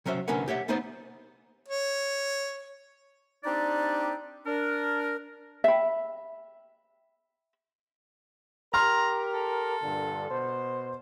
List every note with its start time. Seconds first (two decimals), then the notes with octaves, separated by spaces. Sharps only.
0.06 C3 F#3 C#4 C5 E5
0.28 C2 D3 C#4 A#4 B4 F#5
0.48 G4 C#5 E5 F#5
0.68 A#3 B3 D#4 B4 C5 D5
1.69 C#5
3.44 C4 D4 D#4 G4 D5
4.46 D4 A#4
5.64 E5 B5
8.74 G4 A#4 A#5 C6 F6
9.34 A4
9.83 G2 A#2 D3
10.31 B2 C5